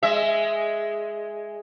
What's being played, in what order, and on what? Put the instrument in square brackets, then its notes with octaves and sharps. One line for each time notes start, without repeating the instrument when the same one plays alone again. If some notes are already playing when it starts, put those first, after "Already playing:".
[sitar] G#3 E5